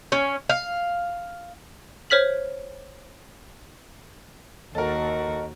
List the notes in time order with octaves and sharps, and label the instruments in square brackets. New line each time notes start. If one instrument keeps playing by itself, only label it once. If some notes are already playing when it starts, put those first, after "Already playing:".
[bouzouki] C#4
F5
[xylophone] C5 C#5 F6 B6 F#7
[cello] D#2 F#4 [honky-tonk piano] A4 A#4 [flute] D#5